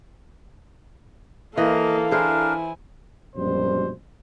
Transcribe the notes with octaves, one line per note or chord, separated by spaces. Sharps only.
E3 A#3 A4 D#5 F5
D4 E4 G#4 A#4 C5 G#5
A#1 F#2 B2 G3 C5